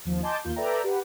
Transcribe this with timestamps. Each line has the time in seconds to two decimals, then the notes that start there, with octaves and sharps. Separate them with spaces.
0.05 D#2 F3
0.23 D#5 G#5 A5 C6 D6 G6
0.44 D#2 A#3 F4 G6
0.56 A4 B4 D5 E5 G5 A#5
0.84 G4 B4 F#5